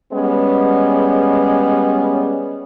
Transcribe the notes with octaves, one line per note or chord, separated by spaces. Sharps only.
G3 G#3 B3 C#4